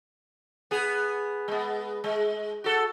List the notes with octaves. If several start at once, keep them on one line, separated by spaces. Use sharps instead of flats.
B3 G#4
G#3 B3
G#3
F#4 A4